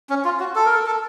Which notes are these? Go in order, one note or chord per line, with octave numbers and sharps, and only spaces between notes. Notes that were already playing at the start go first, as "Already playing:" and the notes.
C#4
F4
F#4
A4
A#4
A4
A4